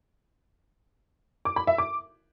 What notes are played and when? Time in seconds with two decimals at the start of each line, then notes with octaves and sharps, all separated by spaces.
1.45 D6
1.56 B5
1.67 E5
1.78 D6